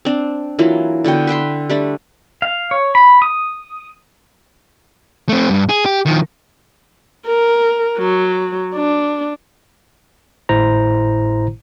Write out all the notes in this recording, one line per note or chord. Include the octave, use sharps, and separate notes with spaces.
C4 D4
E3 F#3 A#3 F4
D3 B3 F#4 G5
B4 E5 G5 C6
G3 A3 D4
F5
C#5
B5
D#6
A3 C4
G2
G#4
G4
D#3 F3
A#4
F#3
D4
G#1 A2 E4 C5 A#5